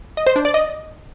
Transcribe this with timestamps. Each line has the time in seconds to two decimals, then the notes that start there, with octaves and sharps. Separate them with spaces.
0.17 D#5
0.27 C5
0.36 D4
0.45 D5
0.54 D#5